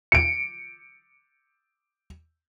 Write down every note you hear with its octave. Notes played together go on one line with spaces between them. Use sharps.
C#7 D7